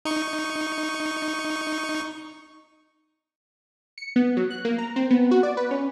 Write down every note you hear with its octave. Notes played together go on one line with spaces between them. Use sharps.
D#4 C#6
C#7
B3
F#3
F#6
A#3
A#5
C4
B3
F#4
D5
B4
C#4